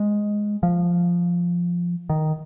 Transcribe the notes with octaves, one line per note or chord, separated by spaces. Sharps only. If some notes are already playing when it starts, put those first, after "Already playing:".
Already playing: G#3
F3
D#3